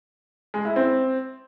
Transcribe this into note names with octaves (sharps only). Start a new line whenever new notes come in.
G#3
E4
C4